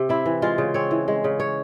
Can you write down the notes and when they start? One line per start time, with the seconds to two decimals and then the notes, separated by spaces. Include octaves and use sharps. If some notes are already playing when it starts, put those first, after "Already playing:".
Already playing: C3
0.09 C4 E4
0.26 E3
0.42 G#3 F4
0.58 C#3
0.74 C4 C#5
0.91 E3
1.08 G#3
1.24 C#3
1.40 C#5